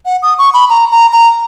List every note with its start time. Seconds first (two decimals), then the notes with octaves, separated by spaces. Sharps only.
0.06 F#5
0.22 D#6
0.39 C#6
0.54 B5
0.70 A#5
0.91 A#5
1.13 A#5